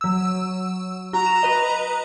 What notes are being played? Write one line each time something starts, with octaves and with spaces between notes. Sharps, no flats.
F#3 E6
F#4 A#5
E7
B4 D#5